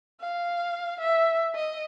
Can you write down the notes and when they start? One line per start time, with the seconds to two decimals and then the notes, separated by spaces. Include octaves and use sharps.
0.21 F5
1.00 E5
1.55 D#5